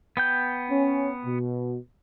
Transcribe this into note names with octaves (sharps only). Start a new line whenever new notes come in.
B3 G5 G6
C#4
B2